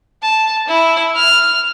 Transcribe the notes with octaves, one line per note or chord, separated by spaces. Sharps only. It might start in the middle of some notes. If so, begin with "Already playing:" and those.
A5
E4
F6